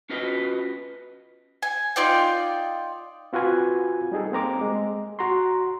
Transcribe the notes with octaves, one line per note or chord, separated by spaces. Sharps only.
C#4 F4 F#4 B4 D#5
G#5
D#4 F4 D5 G5
C4 F4 F#4 B4 G#5
G3 D#4 G#4 A4
A#3 C4 A#5 D6
G#3
F#4 A#5 C6